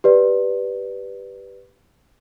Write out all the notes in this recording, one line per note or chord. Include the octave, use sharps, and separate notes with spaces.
G4 B4 D5